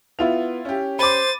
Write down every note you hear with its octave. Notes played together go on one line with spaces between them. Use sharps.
B3 E4 F4 F7
C#4 G4
C5 B5 D6 A6 D#7